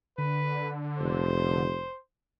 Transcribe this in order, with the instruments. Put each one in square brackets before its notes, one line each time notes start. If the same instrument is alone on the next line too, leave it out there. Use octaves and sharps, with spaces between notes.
[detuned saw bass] D3 [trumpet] B4
[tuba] F1 [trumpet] C5